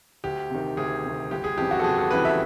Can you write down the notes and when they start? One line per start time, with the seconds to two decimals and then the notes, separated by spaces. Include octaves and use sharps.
0.24 D2 G4
0.50 C3 D#3
0.77 D2 G#4
1.04 C3 D#3
1.31 G1 G4
1.44 G#4
1.57 F2 C#3 E3 G4
1.71 F#4
1.80 A4
1.84 G1 G#4
1.98 A4
2.11 F2 C#3 E3 B4
2.25 E5